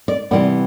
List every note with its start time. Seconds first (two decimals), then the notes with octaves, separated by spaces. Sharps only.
0.08 D5
0.31 C3 E3 G3 B3 D5